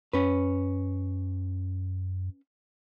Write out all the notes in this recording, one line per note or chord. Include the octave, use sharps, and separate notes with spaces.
F#2 C#4 B4